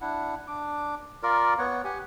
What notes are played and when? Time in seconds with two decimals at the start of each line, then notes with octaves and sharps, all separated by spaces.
0.01 D4 E4 F#5
0.48 D4 D6
1.23 F4 A#4 D5
1.59 B3 C#5 F#5
1.84 G4 F#5 G#5